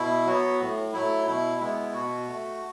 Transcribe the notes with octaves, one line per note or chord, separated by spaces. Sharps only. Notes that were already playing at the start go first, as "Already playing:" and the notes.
Already playing: B2 E4
F#3 B3 F#4
A2
F#3 A3 E4
B2 E4
G#3 B3 E4
B2 F#4
A3